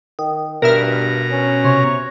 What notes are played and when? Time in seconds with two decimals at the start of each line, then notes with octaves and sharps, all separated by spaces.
0.19 D#3
0.62 G2 B2 A#4 E5 A#5 F6
1.31 C#4
1.64 C3 C#5